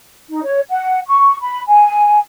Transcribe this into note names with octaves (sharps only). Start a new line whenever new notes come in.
D#4
C#5
F#5
C#6
B5
G#5